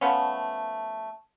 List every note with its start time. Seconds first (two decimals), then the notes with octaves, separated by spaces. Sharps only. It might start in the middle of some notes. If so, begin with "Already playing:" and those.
0.01 F3 A3 B3 C#4